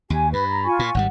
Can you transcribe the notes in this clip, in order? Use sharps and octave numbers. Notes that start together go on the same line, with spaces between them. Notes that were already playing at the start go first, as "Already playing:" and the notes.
D#2 G4 G#5
G2 B4 B5
A#5
F4 G#5 C#6
A#2
G#1 G#2 G3 F#5